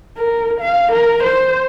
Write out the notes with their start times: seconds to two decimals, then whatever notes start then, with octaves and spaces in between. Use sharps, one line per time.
0.17 A#4
0.61 F5
0.92 A#4
1.23 C5